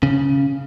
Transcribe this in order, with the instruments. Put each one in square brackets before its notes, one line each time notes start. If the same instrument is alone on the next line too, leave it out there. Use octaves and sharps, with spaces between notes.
[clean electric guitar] C#3